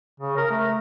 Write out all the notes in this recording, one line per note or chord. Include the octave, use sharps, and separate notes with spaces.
C#3
A#4
A3